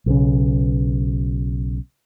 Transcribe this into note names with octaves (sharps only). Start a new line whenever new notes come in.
B1 C#3